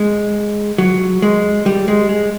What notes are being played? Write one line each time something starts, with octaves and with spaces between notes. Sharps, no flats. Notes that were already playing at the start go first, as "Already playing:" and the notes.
Already playing: G#3
F#3
G#3
G3
G#3
G#3